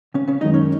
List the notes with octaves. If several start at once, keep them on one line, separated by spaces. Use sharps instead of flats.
C#3 C#4
C#3 C#4
F#2 D#3 G#3 D#4 D#5
C#4 C#5